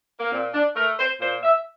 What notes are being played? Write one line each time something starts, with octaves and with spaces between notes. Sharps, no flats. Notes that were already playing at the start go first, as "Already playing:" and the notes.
A#3
A#2 C4
D4
A3 A#4
C5
A#2 C5
E5